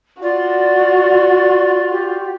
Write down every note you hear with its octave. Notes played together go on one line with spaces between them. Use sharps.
F4 F#4 D5
G4